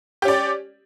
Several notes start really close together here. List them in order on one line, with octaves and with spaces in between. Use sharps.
G4 C#4 D5